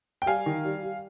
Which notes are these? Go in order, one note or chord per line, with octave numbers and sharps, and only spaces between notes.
G5
G3 F5 G#5
D#3
G3
G3